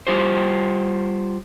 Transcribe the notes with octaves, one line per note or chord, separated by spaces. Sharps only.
G3 F4 G4 C5